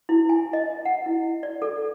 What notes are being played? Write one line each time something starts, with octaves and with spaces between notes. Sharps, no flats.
E4
G#5
D#5
F#5
E4
D5
A4